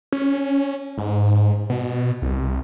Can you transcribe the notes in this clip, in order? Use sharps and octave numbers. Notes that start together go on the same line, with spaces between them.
C#4
G#2
B2
C2